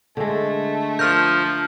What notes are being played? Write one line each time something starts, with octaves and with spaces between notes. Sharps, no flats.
D3 G#3 A3
F3 A#4 F6 G6